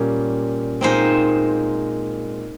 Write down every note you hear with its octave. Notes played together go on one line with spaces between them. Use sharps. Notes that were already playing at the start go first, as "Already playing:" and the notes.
Already playing: A#2 G3 C#4
A#2 G#3 C4 D#4 C5